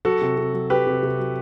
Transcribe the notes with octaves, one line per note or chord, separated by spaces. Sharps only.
F#3 F#4 A4
C3
C3
F#3
F#3 G4 B4
C3
C3
F#3